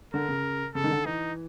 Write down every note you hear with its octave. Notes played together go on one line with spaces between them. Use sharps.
D3 A#4
C#3
C#3 A4
D#3
D3
E3 D#4